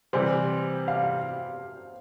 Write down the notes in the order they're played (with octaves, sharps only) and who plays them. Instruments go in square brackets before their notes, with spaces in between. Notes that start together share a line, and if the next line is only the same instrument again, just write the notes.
[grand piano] C3 E3 G3 [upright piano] C5
[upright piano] F5